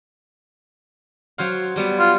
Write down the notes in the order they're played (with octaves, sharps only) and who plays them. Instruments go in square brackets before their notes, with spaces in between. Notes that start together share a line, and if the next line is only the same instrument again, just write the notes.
[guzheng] F#3 C5 F5
F#3 G3 B3
[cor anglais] F4